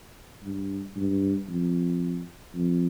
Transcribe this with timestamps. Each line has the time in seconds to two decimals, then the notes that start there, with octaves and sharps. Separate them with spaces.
0.43 G2
0.96 G2
1.48 F2
2.55 F2